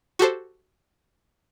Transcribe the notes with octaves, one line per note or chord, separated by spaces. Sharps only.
F#4 G4 A4 C5